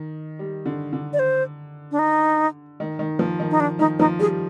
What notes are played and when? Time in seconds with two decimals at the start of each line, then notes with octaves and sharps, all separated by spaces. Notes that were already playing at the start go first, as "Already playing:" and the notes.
Already playing: D#3
0.39 G3
0.66 D3
0.93 D3
1.13 D5
1.19 C5
1.91 D4
1.99 D#4
2.80 D#3
2.99 D#3
3.19 F3
3.40 D#3
3.51 D#4
3.60 D4
3.79 D#3 D#4
3.99 F3 D#4
4.19 G3 G#4